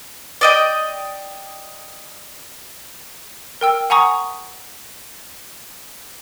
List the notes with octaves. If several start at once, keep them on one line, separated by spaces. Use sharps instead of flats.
D5 D#5 G5
A#4 G5 E6
F#5 G#5 A#5 C#6 D#6